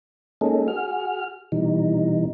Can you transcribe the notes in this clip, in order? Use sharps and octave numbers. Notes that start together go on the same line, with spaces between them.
G#3 A#3 C#4 D#4 G#4 A4
F#4 G#4 F6
B2 D#3 E3 G3 D#4